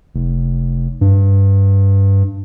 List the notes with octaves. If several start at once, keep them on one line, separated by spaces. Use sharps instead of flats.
F1
G2